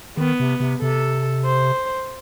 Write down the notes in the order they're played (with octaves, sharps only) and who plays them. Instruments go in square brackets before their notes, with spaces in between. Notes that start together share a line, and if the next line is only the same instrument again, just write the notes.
[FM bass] D#3 [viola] B3
[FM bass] C3
C3
[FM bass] C3 [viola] A4
[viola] C5